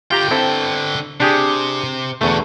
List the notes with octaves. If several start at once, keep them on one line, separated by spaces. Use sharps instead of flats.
D3 F4 G4 G5 A#5
C4 E4 A4
C3 D4 G4 G#4
E2 B2 D3 A3